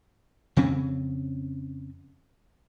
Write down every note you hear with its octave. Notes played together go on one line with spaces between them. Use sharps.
F2 C#3 C4 C#4